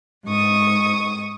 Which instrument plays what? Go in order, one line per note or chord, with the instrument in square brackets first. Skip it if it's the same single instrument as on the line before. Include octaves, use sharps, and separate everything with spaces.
[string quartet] G#2 C#6 D#6